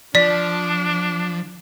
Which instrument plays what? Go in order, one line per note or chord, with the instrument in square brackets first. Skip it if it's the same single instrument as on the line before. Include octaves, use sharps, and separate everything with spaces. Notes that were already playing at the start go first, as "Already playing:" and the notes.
[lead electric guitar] F3 [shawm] D4 [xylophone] D5 B6